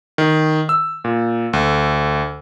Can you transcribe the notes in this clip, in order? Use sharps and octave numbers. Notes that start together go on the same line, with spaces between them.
D#3
E6
A#2
D2